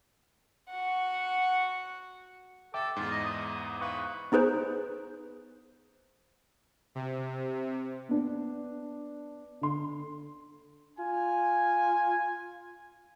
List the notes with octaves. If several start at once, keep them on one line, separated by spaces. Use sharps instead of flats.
F#4 F#5
A4 E5 G5 D6
E2 G#2 F4
D#5
D#6
B4 F5 C#6 D#6
B3 D#4 G#4 B4 C5
C3
B3 D4
D3 C6
F4 G#5